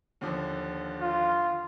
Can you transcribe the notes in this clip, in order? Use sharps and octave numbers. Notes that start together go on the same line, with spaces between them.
D#2 D3 F3
F4